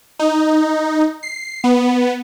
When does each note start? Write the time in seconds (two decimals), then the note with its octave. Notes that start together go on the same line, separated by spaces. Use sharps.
0.19 D#4
1.23 C7
1.64 B3